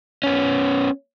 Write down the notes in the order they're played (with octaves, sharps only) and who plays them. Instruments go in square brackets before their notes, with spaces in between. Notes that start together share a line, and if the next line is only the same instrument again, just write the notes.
[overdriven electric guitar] B3 C#4